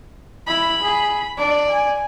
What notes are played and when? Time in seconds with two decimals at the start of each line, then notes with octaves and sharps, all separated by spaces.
0.47 E4 B5
0.83 G#4
1.38 D4 D5
1.70 G#5